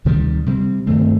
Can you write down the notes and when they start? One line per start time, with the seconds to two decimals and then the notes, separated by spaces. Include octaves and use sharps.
0.05 D2 C3 D#3 G3
0.46 C3 G3 C4
0.87 G2 D#3 A3 C4